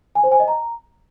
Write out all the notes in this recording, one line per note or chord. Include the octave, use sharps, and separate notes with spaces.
G#5
C5
G#5
D#5
A#5